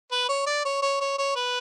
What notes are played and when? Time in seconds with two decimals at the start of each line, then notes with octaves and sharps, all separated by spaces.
0.12 B4
0.29 C#5
0.47 D5
0.65 C#5
0.82 C#5
1.01 C#5
1.18 C#5
1.36 B4